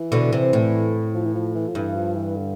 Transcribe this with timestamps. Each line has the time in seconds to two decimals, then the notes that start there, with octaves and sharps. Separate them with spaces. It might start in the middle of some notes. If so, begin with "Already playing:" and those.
Already playing: E3
0.12 B2 D3
0.33 C3
0.53 A2
1.14 F3
1.26 E3
1.35 F3
1.55 E3
1.68 F3
1.75 G2 E3
1.96 F3
2.16 E3
2.36 D3